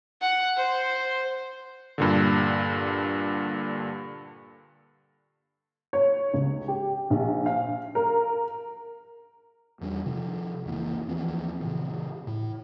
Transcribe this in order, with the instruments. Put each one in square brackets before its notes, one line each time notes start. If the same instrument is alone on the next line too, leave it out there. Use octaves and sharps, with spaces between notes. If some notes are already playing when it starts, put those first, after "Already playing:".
[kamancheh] F#5
C5
[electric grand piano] G2 A#2 D3
[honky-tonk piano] C#5
C#2
G4
A#1
F5
A#4
[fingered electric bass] E2 G3 D4
C3 D#3 F3
F1 C#2 E3 A#3
D#2 E3 F3 C4
A#2 C#3 E3
A2